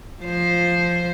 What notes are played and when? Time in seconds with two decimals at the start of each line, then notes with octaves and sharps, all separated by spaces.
0.22 F3 C5